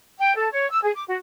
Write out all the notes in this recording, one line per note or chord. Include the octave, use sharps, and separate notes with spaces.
G5
A4
C#5
E6
G#4
D6
F#4